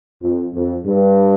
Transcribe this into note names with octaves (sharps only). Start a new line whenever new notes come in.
F2
F2
G2